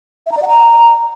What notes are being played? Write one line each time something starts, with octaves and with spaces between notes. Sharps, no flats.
E5
A#5
D5
F#5
A#5